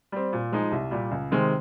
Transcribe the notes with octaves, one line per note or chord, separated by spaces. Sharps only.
G3 C4
A#2
F3 G#3 D#4
C2
A#2 G3
C#2
C3 D#3 G#3 C4